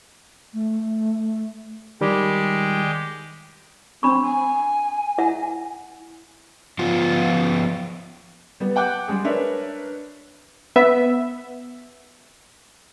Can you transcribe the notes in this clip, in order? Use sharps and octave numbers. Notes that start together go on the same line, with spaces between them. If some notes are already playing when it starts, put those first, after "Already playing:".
A3
D#3 G3 G#3 G4
C4 D4 B5 C#6
G#5
E4 E5 F#5
F3 B3 F4
G3 B3
F#5 G5 D6 F#6 G6
G3 G#3 G#4
D4 A#4 B4 C#5 D5 E5
B3 E5